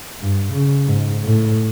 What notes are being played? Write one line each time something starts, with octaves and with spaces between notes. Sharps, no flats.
G2
C#3
G#2
A2